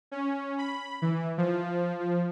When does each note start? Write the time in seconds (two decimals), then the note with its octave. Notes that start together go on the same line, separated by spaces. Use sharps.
0.11 C#4
0.58 B5
1.02 E3
1.38 F3
2.00 F3